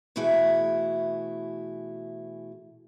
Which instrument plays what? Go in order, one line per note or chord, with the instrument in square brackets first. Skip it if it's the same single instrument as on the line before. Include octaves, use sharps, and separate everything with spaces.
[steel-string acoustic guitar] B2 E3 A3 E4 F#4 G#4